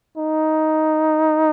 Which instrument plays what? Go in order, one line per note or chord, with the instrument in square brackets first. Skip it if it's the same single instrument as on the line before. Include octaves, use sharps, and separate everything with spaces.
[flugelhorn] D#4